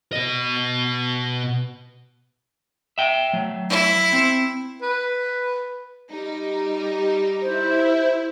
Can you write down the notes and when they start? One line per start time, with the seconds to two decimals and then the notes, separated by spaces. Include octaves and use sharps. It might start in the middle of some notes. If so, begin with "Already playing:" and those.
0.13 B2 D#5
2.98 E5 G5
3.33 F#3 A3
3.70 E4
4.13 C4
4.82 B4
6.11 G3 D#4
7.42 E4 C5